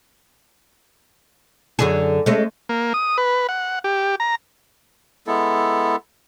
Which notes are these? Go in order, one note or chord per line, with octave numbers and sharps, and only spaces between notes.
F#2 D3 G#4
G#3 A3 C#4
A#3
D#6
B4
F#5
G4
A#5
G#3 B3 E4 A4